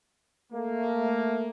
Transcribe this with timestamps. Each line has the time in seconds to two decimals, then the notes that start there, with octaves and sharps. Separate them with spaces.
0.52 A3 A#3